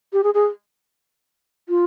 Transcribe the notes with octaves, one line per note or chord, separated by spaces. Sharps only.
G4
G#4
G#4
F4